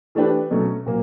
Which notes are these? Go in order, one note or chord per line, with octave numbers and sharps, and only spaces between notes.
E3 A3 D4 G4 B4
B2 F#3 A3 C#4
A#2 F#3 A#3